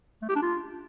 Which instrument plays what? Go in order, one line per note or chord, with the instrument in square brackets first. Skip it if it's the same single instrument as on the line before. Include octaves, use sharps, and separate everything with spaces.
[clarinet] A3
G4
D4
F4